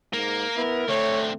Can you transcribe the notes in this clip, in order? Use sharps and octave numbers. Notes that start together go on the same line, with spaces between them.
G#2 A#3 A#4
B3 E4
D3 A3 C4 C#5